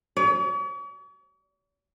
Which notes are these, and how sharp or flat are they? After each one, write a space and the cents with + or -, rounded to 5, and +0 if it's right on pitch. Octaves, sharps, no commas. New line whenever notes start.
C#5 +45